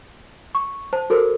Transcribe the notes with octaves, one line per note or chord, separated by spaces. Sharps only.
C#6
C5 A5
F#4 A4 A#4 C5